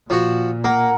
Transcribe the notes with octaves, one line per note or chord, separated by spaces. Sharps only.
A#2 F3 F#4
A#3 A#4 F#5